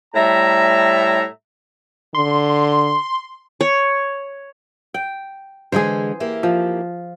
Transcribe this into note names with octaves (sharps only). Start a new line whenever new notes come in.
A2 G3 E5 A#5
D3 C6
C#5
G5
D3 E3 G#3 G#4 C5
A#3 E4 G4
F3